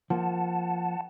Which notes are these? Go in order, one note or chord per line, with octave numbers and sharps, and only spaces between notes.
F3 A#3 F#5 A5